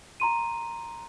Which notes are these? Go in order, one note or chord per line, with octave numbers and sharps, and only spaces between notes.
A#5 C6 D#7